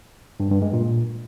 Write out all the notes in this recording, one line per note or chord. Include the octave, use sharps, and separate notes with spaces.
G2
G2
G#3
A#2